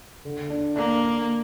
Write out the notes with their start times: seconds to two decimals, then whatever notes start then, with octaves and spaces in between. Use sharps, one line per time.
0.25 D3
0.50 D4
0.76 A#3 D4
1.02 D4